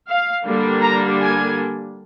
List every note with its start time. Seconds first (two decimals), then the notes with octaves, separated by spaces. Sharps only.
0.09 F5
0.45 D3 G3 A#3 D4
0.82 A#5
1.18 G#5